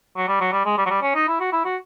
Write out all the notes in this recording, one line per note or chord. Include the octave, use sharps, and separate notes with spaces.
F#3
G3
F#3
G3
G#3
G3
F#3
G3
C#4
D#4
E4
F#4
E4
F#4